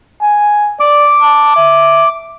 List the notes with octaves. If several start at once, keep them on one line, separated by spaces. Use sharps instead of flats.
G#5
D5 D6
A5
E5